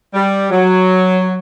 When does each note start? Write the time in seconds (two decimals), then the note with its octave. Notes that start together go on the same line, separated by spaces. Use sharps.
0.14 G3
0.50 F#3